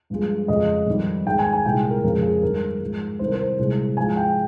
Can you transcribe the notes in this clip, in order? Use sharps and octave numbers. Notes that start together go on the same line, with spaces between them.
G2 F3 G#3
F2 C#3 F3 G#3 D#5
F2 D#3 G3
G#2 D#3 G#3 G5
G#5
G#5
C2 A#2 G#3 G5
A#4
F2 C#3 F3 G#3 A#4
G#4
G2 D#3 G#3 A#4
G#2 F3 G#3
C2 C3 D#3 C5
A#4
C5
C2 A#2 G#3
G#2 F3 G#3 G#5
G5